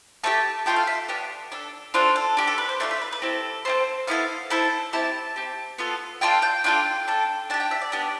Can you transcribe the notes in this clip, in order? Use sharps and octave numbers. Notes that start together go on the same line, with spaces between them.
A3 D4 G4 A5
A3 D4 F4 A4 G5
F5
E5
B3 D4 G4
D4 A4
D4 F4 A4 C5
A4
D4 G4
A4
B4
C5
A3 D4 F4 D5
E5
B4
B4
C4 E4 G4 A4
C4 F4 A4 C5
B3 E4 A4 F5
C4 E4 A4 A5
C4 E4 G4 A5
C4 G4
B3 F4 A4
D4 F4 A4 G5
G5
D4 F4 A4 G5
D4 A4
D4 G4 A5
G5
E5
D5
B3 D4 G4